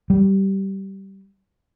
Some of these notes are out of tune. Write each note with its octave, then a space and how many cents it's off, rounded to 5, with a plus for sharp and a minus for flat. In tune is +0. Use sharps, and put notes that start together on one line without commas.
G3 -15